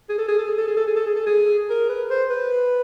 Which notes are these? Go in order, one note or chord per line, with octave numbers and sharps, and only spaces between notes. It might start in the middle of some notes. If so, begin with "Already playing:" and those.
G#4
A4
G#4
A4
G#4
A4
G#4
A4
G#4
A4
G#4
A4
G#4
A#4
B4
C5
B4